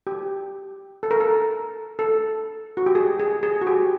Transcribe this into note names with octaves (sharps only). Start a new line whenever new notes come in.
G4
A4
A#4
A4
A4
F#4
G4
G#4
G#4
G#4
F#4
G4